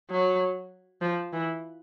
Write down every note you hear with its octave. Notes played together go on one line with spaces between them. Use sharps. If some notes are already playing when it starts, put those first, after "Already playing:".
F#3
F3
E3